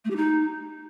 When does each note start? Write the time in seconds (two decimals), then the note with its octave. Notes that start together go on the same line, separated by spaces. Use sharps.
0.04 A3
0.10 G4
0.16 D#4